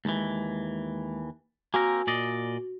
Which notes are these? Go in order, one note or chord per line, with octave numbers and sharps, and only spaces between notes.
D#2 E3 G#3
A#3 C4 F#4 A#4 G#5
A#2 D5 D#5